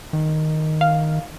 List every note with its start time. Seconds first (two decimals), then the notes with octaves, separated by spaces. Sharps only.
0.13 D#3
0.81 F5